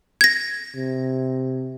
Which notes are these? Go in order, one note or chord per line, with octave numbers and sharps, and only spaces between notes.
G#6 A#6
C3